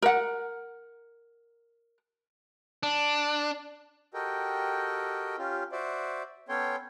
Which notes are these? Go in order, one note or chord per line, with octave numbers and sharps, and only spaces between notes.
A#4 F#5
D4
F#4 G4 A4 A#4 D#5 G5
C#4 F4 G4
F#4 C5 D5 E5
B3 C#4 A4 C#5 G5 C6